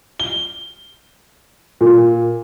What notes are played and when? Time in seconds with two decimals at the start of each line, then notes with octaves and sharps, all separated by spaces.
0.20 G7
1.81 A#2